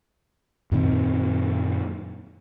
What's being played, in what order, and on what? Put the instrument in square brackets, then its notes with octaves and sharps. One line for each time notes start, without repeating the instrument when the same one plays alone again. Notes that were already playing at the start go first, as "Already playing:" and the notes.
[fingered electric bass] F#2 A#2 D#3 C4